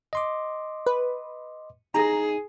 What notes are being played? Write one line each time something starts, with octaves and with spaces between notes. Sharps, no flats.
D#5 C6 D6
B4
D#4 G#4 A#5